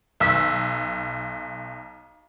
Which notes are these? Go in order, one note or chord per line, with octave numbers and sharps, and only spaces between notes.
B1 E6 B6